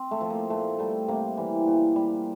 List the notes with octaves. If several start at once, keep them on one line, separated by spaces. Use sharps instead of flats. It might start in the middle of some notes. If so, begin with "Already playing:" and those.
Already playing: C4
A3
F3
A#3
A#2 A3
G3 A3
C3 A#3
E3 G3
A#2
G3